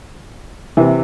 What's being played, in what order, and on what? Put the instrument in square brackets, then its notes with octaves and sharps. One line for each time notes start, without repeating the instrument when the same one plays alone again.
[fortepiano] C3 E3